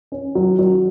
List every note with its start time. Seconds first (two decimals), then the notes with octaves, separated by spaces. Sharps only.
0.12 C#4
0.35 F#3
0.59 F#3